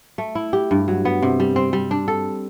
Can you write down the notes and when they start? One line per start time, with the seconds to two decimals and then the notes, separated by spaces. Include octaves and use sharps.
0.18 A3
0.35 E4
0.53 G4
0.71 G2
0.88 F#3
1.05 B3
1.22 C3
1.40 G3
1.56 C4
1.73 G3
1.91 D4
2.08 A4